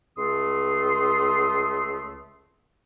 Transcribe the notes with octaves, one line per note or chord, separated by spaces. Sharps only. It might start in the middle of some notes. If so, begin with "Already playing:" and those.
C#2 A3 C6 D#6